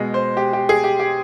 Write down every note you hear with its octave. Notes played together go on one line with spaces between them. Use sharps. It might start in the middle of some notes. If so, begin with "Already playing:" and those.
Already playing: B2 G#3
C5
G4
G4
G#4
G4
G4